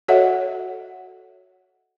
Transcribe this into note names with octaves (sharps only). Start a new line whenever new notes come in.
F#4 A4 C#5 D#5 E5 F#5